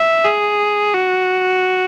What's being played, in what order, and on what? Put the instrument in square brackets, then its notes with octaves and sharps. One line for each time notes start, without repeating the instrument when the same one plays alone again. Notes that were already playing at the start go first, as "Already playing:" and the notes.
Already playing: [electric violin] E5
G#4
F#4